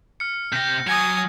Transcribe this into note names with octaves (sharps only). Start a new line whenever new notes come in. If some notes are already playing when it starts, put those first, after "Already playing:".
F6 C#7
C3 G5 G6 A#6
F#3 G#5 D#6